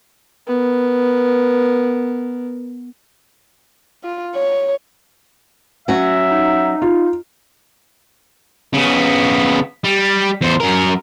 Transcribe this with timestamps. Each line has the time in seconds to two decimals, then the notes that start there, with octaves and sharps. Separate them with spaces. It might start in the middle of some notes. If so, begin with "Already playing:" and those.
0.47 B3 A#4
4.04 F4
4.34 C#5
5.88 F#3 C#4 F#4 E5
6.31 D#4
6.82 F4
8.73 C#3 B3
9.84 G3
10.41 E2 C5
10.60 F#2 A#4